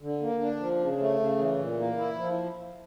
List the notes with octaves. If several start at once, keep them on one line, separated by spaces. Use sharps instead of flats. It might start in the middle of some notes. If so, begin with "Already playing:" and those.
D3
A#3
D4
F3
C#3
A3
C#3
E3
A#2
A#3
E4
F3